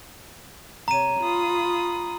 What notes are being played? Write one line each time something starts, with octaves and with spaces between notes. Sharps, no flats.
C3 C#5 A#5 D#7
F4 B5 D#6